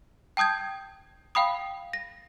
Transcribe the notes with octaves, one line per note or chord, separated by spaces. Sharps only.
G5 A5 D#6 G6 G#6
F5 G5 B5 D#6
A#6